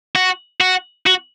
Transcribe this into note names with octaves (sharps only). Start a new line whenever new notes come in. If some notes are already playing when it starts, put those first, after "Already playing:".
F#4
F#4
F#4